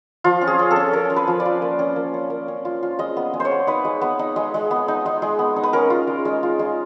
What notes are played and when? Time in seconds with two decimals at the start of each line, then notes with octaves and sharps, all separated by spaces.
0.24 F3 F4
0.41 C#4
0.47 G#4
0.59 C#4
0.71 A4
0.76 C#4
0.93 C#4 A#4
1.10 C#4
1.16 B4
1.28 F3
1.40 D5
1.45 F4
1.62 A#3
1.79 C#4
1.96 A#3
2.14 C#4
2.30 A#3
2.48 C#4
2.65 F4
2.83 F4
2.99 G#3 D#5
3.17 B3
3.33 G#3
3.40 C5
3.45 C#5
3.51 B3
3.67 D#4 B4
3.85 G#3
4.02 B3
4.19 D#4
4.36 G#3
4.54 G#3
4.71 B3
4.88 D#4
5.06 G#3
5.22 G#3
5.39 B3
5.56 D#4
5.63 B4
5.73 C#4 A#4
5.90 F4
6.07 G#3
6.25 G#3
6.43 F4
6.59 G#3